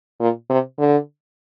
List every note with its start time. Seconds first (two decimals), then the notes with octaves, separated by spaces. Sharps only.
0.20 A#2
0.50 C3
0.79 D3